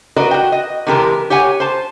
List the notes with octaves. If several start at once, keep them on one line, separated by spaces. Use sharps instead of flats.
F#4 A#4 B4 D5 D#5
F#4 G5
D#5
C3 E3 G#3 G4 A#4 A5
G4 C#5 F#5 G#5
C5 A5